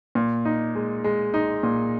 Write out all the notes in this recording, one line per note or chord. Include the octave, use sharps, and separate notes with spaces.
A#2
D#4
G#3
G#3
D#4
A#2